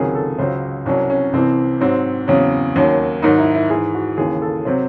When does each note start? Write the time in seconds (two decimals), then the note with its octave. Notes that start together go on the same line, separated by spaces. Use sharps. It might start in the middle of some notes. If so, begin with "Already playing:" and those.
Already playing: C#2 C3 D#3 F#3 G#4
0.15 A4
0.39 C#2 C#3 F#3 C5
0.86 C2 C3 F#3 C#4
1.10 C#4
1.33 C2 C3 E3 C4
1.81 G#2 F#3 C4
2.28 E2 C#3 F#3
2.76 D#2 D#3 F#3 C#4
3.22 G#2 D#3 F#3 D#4
3.38 E4
3.55 E4
3.70 G#2 E3 G#4
3.95 F#4
4.17 D#2 C#3 E3 G#4
4.42 A4
4.65 C3 F#3 C5